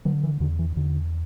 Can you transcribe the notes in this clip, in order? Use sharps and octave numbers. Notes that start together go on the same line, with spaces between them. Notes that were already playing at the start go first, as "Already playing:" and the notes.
D3 F#3
E3
E2 D3
E3
E2 D3